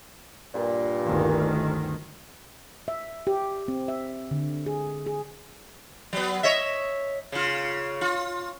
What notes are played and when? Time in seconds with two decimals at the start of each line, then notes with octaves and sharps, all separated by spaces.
0.54 G2 A#2
1.04 G1 D2 D#3
2.88 E5
3.27 G4
3.68 C4
3.88 E5
4.31 D3
4.66 G#4
5.07 G#4
6.13 F#3 B3
6.43 C#5 D#5 E5
7.32 C#3 F4
8.01 F4